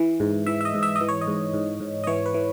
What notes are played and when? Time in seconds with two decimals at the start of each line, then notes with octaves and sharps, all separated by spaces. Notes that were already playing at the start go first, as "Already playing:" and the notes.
Already playing: E3 E5
0.20 G#2
0.46 E3 E5
0.61 E5
0.65 D#5
0.74 G#2
0.83 E5
0.96 D#5
1.01 E3
1.08 C#5
1.21 D#5
1.27 G#2
1.54 G#2
1.80 G#2
2.04 D#5
2.07 E3 C#5
2.26 B4
2.34 E3